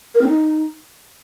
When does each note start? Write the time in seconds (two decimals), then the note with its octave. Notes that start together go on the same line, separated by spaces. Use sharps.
0.14 A#4
0.21 C4
0.28 D#4